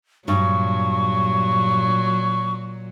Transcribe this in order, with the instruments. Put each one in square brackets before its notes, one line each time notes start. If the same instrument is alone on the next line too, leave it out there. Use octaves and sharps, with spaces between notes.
[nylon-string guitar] G2 [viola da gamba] A#2 F#3 [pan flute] C#6